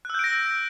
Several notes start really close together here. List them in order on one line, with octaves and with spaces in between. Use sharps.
F#6 E6 G6 D7 A#6